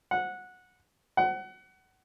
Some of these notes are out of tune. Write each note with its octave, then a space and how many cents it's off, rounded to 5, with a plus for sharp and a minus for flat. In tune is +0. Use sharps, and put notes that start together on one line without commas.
F#5 -15
F#5 +25